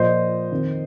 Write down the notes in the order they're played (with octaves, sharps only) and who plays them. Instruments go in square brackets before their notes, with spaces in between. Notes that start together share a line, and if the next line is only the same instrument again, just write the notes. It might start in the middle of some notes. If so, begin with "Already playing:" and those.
Already playing: [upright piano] A#2 F3 C5 D#5
F2 D#3